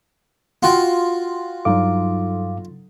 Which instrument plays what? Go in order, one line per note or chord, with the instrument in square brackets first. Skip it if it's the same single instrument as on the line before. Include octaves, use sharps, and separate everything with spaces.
[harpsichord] F4 F#4 [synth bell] F#5 G5
[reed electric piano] G2 F5 D6 [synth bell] F#3 D#4 A4